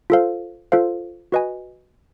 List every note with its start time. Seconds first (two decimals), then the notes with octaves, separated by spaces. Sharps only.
0.10 F4 A4 C5 F5
0.72 F4 A4 C5 F5
1.32 F#4 B4 D#5 G#5